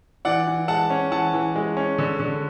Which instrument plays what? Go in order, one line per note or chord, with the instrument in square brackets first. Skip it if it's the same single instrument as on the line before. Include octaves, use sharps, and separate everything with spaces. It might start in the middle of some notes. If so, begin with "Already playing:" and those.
[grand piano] E3 D5 F#5
E3
G#3 F#5 A5
C#4
E3 F#5 A5
E3
G#3
C#4
D3
D3